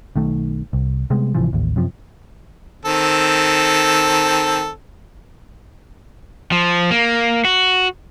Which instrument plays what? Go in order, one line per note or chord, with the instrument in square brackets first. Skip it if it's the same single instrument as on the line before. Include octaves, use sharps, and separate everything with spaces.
[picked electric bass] B1 D#3 A3
C2
C3 G3 G#3 B3
G#1 C3 E3 F3
A1 D#2
F#2 C3 F3
[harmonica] D#3 C4 A4
[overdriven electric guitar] F3
A#3
F#4